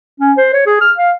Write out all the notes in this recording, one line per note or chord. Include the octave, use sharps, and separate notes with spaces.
C#4
C5
C#5
G#4
F6
F5